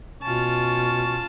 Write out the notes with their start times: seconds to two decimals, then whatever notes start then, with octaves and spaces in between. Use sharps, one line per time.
0.23 B2 C#4 F4 A5